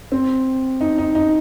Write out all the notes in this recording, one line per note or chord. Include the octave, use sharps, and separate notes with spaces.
C4
D#4
D#4
D#4